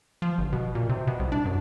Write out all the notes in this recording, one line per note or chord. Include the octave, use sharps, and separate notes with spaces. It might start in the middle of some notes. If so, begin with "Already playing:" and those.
F3
G1
B2
A#2
C3
B2
C2
D4
F#2